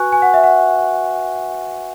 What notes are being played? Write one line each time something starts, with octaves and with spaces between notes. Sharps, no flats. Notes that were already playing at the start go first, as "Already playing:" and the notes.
Already playing: F#4 B4 G#5 C#6 F#6
G#5
F#5
E5
F#5